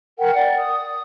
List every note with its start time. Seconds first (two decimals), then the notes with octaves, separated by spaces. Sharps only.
0.19 A#4 F#5 G5
0.35 D5 F#5
0.57 D#6